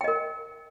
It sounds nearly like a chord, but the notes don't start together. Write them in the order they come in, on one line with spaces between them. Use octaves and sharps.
G5 D#5 A#4